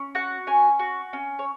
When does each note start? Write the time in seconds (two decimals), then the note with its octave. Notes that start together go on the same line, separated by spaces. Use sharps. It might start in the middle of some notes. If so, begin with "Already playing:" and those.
Already playing: C#4
0.15 F#4 F#5
0.47 C#4 G#5
0.79 F#4
1.13 C#4
1.39 C#5